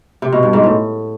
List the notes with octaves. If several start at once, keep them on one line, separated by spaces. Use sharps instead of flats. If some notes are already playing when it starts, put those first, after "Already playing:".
C3
B2
G2
G#2
A2